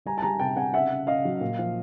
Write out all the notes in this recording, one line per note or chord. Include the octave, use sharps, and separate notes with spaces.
G3 G#5 A#5
A5
G3 G#5 A#5
C3 G5 A5
C3 F#5 G#5
C#3 E5 F#5
C#3
C#3 D#5 F5
F#3
A#2
F3